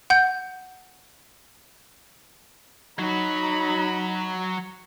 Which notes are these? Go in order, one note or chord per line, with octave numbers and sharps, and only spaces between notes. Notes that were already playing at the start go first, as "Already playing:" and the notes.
F#5 G6
F#3 D#4 F#4 B5